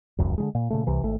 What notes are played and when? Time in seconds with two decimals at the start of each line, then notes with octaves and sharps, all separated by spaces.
0.18 D#1 C#2 F#2
0.38 D3 D#3 G#3
0.55 A#2
0.70 A#2 C#3 A3
0.87 C2 C3 E3
1.03 G#1 A3